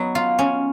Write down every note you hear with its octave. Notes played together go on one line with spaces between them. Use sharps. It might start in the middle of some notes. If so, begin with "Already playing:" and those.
Already playing: F#3 B3 D#4
F4
C#4